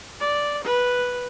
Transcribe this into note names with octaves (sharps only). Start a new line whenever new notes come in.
D5
B4